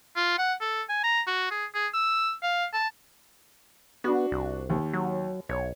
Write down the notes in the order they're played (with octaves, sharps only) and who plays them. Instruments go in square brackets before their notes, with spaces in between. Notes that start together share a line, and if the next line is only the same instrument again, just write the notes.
[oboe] F4
F#5
A4
G#5
A#5
F#4
G#4
G#4
E6
F5
A5
[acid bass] B3 [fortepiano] D4 F#4
[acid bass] C2
[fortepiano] D#2
[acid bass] F#3
[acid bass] B1 [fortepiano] C#5